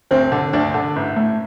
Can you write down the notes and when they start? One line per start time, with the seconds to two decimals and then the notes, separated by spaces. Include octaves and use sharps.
0.11 D2 C4
0.32 D3
0.53 D2 D4
0.74 D3
0.96 A1
1.16 A2